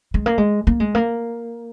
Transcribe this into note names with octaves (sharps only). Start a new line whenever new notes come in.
G#3
A#3
G#3
A#3
G#3
A#3